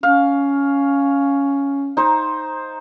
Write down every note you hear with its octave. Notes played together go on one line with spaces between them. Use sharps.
C#4 F5
D#4 C5